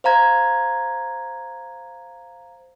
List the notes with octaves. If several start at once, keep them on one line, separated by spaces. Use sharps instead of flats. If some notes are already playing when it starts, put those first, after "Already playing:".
C5 F5 A#5 G#6